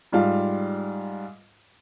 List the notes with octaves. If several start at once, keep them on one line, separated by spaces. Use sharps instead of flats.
G#2 G3 F4 F5